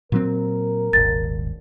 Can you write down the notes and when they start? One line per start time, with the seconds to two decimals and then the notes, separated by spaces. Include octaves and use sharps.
0.12 A#2 F#3 C4 A#4
0.93 D#1 G#1 A6